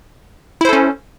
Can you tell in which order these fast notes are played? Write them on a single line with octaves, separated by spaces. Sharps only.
E4 C5 A4 C#4